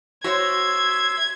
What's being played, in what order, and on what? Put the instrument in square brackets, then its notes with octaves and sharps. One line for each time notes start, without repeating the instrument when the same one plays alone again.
[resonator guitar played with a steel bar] F#4 C5 C#5 [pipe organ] E5 C6 E6 [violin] G#6